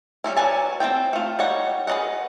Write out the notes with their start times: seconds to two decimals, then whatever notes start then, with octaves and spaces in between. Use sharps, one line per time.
0.24 G3 C#4 E4
0.36 F#3 B4 D5 G#5 A5
0.80 C4 F4 A4 G5
1.13 A3 F4
1.39 G3 D#4 C#5 F#5
1.87 G#4 B4 D5 D#5 F#5